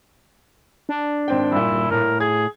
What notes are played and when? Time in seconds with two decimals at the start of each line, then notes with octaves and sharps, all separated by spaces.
0.89 D4
1.28 G#1 C4 G5
1.52 G2 A#2 E4
1.70 D#1
1.91 A2 A#4
2.20 G#4 G#6